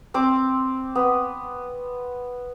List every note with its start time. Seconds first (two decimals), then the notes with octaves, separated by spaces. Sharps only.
0.14 C4 C6 D6
0.95 B3